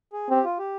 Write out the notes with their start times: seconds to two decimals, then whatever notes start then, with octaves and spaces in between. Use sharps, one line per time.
0.13 G#4
0.30 C4 G4
0.44 F4
0.59 G4